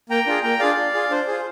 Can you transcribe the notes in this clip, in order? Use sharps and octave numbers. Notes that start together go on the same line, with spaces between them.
A#3 G5 A#5
D4 F4 G#4
A#3 G5 A#5
D4 F4 G#4 D5 F5
D4
F4 G#4
D4 C5
F4 G#4